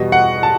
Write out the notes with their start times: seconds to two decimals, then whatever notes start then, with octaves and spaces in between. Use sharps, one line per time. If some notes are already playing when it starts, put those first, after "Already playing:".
Already playing: E2 B2 G3 D#5
0.12 F#5
0.43 A5